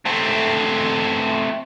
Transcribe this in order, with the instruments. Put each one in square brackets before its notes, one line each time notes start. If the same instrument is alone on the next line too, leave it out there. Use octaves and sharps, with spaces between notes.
[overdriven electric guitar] A3 C4